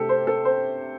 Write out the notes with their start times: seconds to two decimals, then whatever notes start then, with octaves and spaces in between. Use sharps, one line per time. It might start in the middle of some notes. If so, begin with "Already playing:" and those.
Already playing: C3 A3 D4 G4 A4
0.09 C5
0.27 A4
0.45 C5